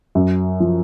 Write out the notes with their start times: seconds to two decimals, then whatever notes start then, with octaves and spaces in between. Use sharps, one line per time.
0.15 F#2
0.60 F3